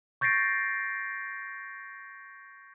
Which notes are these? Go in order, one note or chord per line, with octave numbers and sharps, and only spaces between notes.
C#6 G6 A6 A#6 C7 D7